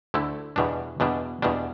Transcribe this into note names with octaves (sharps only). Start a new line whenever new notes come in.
D2 D3 A3 E4
E2 B2 G3 D4
E2 B2 G3 D4
E2 B2 G3 D4